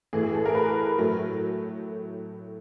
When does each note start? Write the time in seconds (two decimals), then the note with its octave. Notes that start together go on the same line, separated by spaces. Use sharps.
0.13 A2 E3 A3 G#4
0.23 G#4
0.35 A4
0.46 A#4
0.55 B4
0.98 A2 F#3 A3